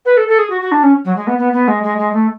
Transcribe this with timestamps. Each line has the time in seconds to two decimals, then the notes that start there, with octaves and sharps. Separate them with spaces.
0.05 B4
0.17 A4
0.28 A4
0.38 G#4
0.50 F#4
0.61 F#4
0.71 D4
0.83 C#4
1.05 F#3
1.16 G#3
1.27 B3
1.38 B3
1.53 B3
1.67 G#3
1.83 G#3
1.98 G#3
2.13 A3